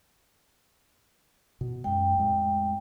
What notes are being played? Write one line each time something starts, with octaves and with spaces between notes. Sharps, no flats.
B2
F#2 G#3 G5
F2 A2 G#3